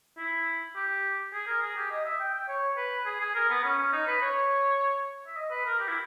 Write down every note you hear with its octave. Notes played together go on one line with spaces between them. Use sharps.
E4
G4
G#4
A#4
G#4
G4
D#5
E5
G5
G5
C#5
B4
G#4
G#4
A#4
B3
C#4
C#4
D#4
B4
C#5
E5
D#5
B4
A#4
G4
E4